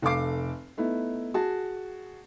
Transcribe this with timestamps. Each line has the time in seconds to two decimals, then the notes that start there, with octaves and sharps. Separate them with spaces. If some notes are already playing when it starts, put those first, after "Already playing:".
0.02 F1 A4 F5 D6 C7
0.77 A3 B3 D#4 E4
1.34 F#4 G#4 A5